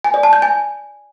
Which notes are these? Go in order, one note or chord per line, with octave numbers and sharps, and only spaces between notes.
G#5
D5
A5
G6
G#5